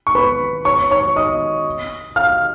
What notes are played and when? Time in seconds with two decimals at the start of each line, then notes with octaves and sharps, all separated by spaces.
0.07 C#6
0.15 B4 B5
0.65 C#5 C#6
0.91 C#5 C#6
1.16 D#5 D#6
2.16 F5 F6